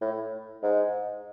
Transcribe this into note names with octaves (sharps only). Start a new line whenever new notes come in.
A2
G#2